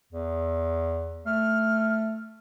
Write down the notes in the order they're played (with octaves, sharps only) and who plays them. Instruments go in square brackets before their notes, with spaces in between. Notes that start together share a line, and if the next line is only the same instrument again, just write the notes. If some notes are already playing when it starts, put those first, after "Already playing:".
[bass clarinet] E2
[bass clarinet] A3 [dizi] F6